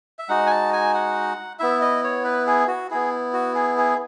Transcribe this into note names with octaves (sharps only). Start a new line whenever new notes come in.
E5
G#3 D#4 F#4 F#5
G#5
A5
G#5
F#5
B3 E4 E5
D#5
C#5
B4
G#4
F#4
B3 E4 G#4
F#4
G#4
G#4